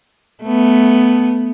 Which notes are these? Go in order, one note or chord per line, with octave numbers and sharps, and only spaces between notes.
A3 B3